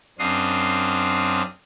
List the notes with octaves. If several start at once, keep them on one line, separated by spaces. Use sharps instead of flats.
F#2 C4 D4 F5 C6 D#6